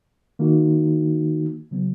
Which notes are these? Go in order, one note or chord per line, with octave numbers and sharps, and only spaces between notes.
D#3 A#3 D#4 F#4
C#3 F#3 B3